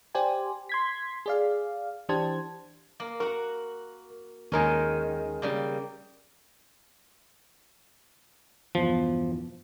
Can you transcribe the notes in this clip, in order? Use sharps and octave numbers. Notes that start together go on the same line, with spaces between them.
G4 C5 D5 G#5
C6 G#6 B6
G#4 D5 F5
E3 D4 G4 C5 A5 G#6
A#3
F#4 A#4 F#5
D#2 D#3 G#3 C#4 A#4 G#5
C#3 G3 A#3
E2 G2 B2 F3